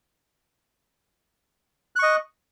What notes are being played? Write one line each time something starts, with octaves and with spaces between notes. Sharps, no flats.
D#5 C#6 F#6